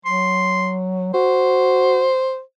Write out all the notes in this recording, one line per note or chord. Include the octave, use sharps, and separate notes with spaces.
F#3 C6
F#4 C5